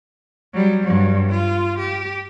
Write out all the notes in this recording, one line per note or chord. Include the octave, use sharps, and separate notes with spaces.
F#3 G3
G2 F#3
F4
G4